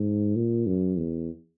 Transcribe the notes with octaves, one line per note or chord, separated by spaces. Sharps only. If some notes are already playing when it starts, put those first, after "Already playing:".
Already playing: G#2
A#2
F#2
E2